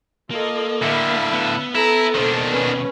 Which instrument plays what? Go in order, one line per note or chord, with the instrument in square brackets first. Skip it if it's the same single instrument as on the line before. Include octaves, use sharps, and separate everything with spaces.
[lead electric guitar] A#3 [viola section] F4 A4 D#5
[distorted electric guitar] A2 D3 [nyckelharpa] E5 [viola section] F5 B5
[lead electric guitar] B3
[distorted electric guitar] E4 [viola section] A4 [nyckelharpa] A#5
[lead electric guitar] D#2 B2 [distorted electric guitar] D#3 D4 [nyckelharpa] C5
[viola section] C#4 [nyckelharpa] B4